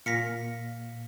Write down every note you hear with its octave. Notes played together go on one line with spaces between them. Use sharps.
A#2 F5 A#6 B6 C#7